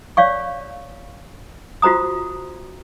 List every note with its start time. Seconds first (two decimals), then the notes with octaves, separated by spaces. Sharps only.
0.17 C#5 D5 F5 C#6
1.82 F4 F#4 C5 A#5 D#6